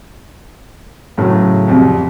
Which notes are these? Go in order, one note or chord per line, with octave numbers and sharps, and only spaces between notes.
A2 C#3 F#3
C2 F2